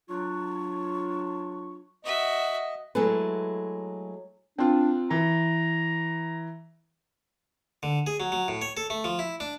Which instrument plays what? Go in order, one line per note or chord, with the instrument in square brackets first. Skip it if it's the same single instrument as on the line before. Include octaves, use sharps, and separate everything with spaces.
[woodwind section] F#3 D4 F4 [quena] C#6
[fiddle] F#4 E5 [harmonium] D#5
[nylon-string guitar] F#3 G#3 A3 E4 G#4 B4
[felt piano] C4 F4 [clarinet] D4
[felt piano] E3 [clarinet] A#5
[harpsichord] D3
G#4
F#3
F#3
A2
C#5
A4
A3
F3
E4
D4